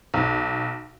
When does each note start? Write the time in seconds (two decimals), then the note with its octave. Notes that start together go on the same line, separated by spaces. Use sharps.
0.14 B1